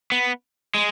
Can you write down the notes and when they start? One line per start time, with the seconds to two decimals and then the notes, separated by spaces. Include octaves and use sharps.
0.12 B3
0.75 G#3